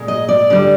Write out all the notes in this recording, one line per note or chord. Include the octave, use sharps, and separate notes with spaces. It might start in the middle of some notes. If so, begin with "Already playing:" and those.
Already playing: A#2 G#3
D#5
D5
D3 G3